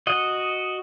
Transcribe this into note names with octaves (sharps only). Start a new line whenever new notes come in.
F#4 D#5